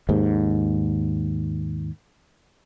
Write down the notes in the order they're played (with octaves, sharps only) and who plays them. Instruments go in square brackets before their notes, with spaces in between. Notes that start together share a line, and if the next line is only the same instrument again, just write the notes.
[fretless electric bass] D#2 G#2